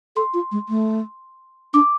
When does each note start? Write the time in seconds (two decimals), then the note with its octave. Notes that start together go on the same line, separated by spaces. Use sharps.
0.16 A4 C6
0.34 F4
0.52 G#3
0.69 A3
1.74 D4 D6